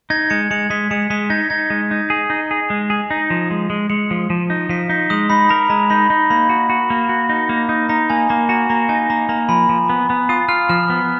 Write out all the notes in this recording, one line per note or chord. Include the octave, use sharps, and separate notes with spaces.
D#4 G#6
G#3 C#7
G#3 C#7
G#3 B6
G#3 C#7
G#3 B6
D#4 G#6
D#4 G#6
G#3
D#4
G#4
D#4
G#4
G#3
G#4
D#4
F3
G#3
G#3
G#3 C#7
F3
F3
D#4
F3 B6
D#4 B6
G#3 D#6
D#4 B5
A#4 A#5
G#3 A#5
D#4 B5
D#4
A#3 B5
F#4
F#4
A#3
F#4
D#4
A#3
D#4
D#4 A#5
A#3 G#5
A#3 A#5
F#4 A#5
A#3 A#5
D#4 G#5
A#3 A#5
A#3 A#5
F3 B5
F3
B3
B3
F4 D#6
F4 F6
F3 F6
B3